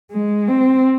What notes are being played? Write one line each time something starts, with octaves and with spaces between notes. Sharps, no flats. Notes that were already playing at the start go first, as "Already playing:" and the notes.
G#3
C4